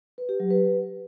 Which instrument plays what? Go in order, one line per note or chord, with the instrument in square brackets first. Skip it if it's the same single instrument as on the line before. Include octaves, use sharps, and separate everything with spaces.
[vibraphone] B4
G4
F#3
B4